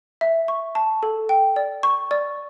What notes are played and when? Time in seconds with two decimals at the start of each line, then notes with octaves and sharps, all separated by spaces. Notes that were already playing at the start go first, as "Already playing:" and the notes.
0.21 E5
0.48 C#6
0.75 A5
1.03 A4
1.29 G5
1.56 D5
1.83 C#6
2.11 D5